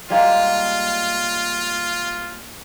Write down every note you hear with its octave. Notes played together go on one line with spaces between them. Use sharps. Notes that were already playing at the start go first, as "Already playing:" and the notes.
G3 G#3 A#3 F4